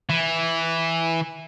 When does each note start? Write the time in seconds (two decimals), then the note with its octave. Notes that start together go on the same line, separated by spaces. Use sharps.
0.10 E3